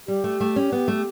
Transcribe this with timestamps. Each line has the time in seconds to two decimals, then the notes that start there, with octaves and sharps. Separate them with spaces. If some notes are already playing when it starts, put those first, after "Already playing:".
0.07 G3 G4
0.24 A3
0.41 A3
0.56 C#4
0.72 B3
0.88 A3